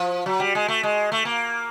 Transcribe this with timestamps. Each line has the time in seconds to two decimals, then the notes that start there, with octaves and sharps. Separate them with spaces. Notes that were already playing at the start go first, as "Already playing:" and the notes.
Already playing: F3
0.26 F#3
0.40 G3
0.55 G#3
0.68 A3
0.83 G#3
1.12 A3
1.25 A#3